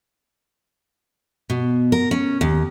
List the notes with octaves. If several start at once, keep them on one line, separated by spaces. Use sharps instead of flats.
B2
A#4
C#4
D#2